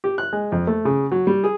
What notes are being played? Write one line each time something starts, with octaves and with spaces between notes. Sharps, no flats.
G4
F#6
G#3
F2
A3
C#3
F#3
G3
G#4